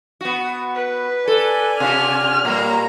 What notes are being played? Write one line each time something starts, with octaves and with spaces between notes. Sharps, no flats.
B3 F#4
B4
A4 D5 G#5
C3 D4 F#4 F6
A#2 G3 A#3 C#5 A#5